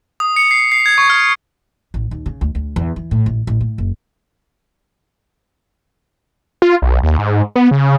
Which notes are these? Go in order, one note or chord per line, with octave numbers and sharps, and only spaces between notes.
D#6
C#7
C7
C7
G#6
C#6
F6
A1
D#2
C#3
D2
D2
E2
E3
A2
A1
A1
A2
F#1
F4
B1
D#2
G#2
B3
C#3